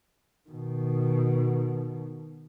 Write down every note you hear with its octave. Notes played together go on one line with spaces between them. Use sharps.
B2 D#3